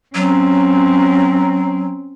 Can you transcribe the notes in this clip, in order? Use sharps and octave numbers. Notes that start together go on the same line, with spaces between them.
F#3 C4 C#4